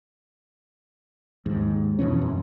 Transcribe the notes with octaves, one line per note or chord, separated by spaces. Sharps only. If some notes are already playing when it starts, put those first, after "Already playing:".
D#2 G#2
F2 B2 E3 C#4
F#2